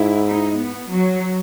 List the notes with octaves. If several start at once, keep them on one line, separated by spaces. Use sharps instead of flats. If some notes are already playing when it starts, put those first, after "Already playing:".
Already playing: G#2 E4
D#4
B3
F#3